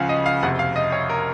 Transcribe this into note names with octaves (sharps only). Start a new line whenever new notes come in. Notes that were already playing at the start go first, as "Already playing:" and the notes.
Already playing: C#2 C#3 F3 F5 F#5 G#5
D#5
F5
F#1 F2 C3 F#5
F5
D#5
C#5
A#4